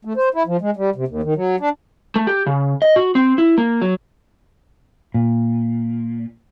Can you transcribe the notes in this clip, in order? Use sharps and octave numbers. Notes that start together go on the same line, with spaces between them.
A3
C5
E4
F3
G#3
G3
C3
D#2
D#3
F#3
D4
A3
G4
C#3
D#5
F#4
C4
E4
A#3
F#3
A#2